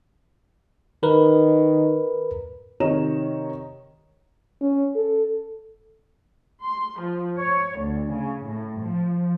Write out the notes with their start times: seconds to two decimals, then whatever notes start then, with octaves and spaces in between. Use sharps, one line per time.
1.03 D#3 A#4 B4
2.80 C3 D#3 C#5 D#5 A#5 E7
4.61 C#4
4.96 A4
6.63 C6
7.00 F3
7.37 C#5
7.79 D2
8.11 C#3
8.46 A2
8.80 F3